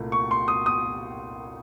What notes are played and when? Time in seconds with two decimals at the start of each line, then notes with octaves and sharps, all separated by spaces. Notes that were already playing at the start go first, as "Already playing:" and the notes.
Already playing: C2 A#2 A3
0.12 C#6
0.31 C6
0.48 D#6
0.66 D#6